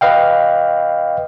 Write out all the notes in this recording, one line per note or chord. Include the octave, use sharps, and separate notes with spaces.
B4 D#5 F5 G5